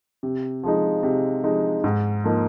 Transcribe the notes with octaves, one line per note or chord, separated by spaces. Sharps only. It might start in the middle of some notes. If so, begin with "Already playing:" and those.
C3
F3 G#3 D#4
C3
F3 G#3 D#4
G#2
F3 A#3 D#4